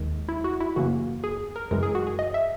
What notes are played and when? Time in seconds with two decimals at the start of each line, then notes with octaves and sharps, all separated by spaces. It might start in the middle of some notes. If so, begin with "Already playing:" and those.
Already playing: D#2 D#3 G#3
0.29 E4
0.44 F#4
0.60 E4
0.76 F#2 C#3 E3 A#3 F#4
1.24 G#4
1.56 A#4
1.71 F#2 C#3 E3 G#3 A#4
1.83 G#4
1.95 F#4
2.07 G#4
2.19 D#5
2.34 E5